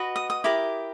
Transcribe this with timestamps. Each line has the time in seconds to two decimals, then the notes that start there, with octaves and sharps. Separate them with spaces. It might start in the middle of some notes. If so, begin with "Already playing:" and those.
Already playing: F#4 B4 D#5
0.16 D#6
0.30 D#6
0.44 E4 G4 A#4 D6